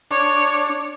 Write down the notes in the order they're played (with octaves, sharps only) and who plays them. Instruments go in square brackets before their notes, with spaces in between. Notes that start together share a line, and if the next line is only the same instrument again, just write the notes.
[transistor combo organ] D4 [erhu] C#5